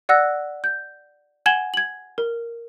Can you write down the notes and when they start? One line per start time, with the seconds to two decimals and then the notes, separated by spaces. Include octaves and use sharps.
0.09 D5 F#5 E6 F#6 A#6
0.64 G6
1.46 F#5 G#5 G#6 E7 F#7 G7
1.74 G#6 F#7
2.18 A#4